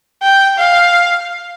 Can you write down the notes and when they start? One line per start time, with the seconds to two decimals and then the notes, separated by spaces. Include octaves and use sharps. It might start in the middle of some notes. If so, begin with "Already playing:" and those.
0.23 G5
0.58 F5